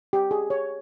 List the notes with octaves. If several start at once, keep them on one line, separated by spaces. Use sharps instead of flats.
G4
G#4
C#5